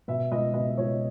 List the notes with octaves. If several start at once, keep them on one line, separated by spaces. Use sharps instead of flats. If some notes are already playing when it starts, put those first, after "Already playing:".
B2 E5
C#2 D#5
B2 D#5
C#2 C#5